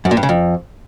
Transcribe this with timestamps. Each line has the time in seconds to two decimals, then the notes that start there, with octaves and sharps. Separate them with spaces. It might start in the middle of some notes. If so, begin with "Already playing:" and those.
0.05 F#2
0.11 A#2
0.17 G2
0.23 C#3
0.29 F2